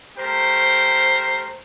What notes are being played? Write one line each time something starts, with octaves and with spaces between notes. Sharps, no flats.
A3 G4 A#4 C5